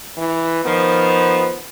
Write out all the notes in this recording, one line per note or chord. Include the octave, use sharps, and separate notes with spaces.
E3
D#3 F3 B3